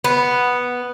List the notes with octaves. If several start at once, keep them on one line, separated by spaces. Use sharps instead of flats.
B3